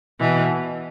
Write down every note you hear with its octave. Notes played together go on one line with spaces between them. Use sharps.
B2 E3